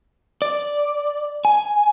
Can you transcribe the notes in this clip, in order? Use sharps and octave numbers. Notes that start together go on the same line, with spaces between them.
D5
G#5